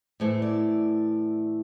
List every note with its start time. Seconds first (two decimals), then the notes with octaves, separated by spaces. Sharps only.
0.20 A2 E3 A3 E4 C5
0.42 D5